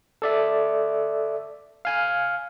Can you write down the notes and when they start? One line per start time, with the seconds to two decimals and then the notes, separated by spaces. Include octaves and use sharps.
0.22 A4 D5 E5
1.85 F5 G#5 F6